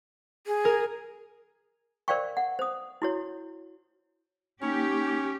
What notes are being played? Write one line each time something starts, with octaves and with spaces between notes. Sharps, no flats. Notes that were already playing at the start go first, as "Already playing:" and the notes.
G#4
A#4 G#6
A#4 C5 D5 F5 G5 C#6
F#5
C5 D#6
E4 F#4 C#5
A#3 C#4 D#4 G4 C#6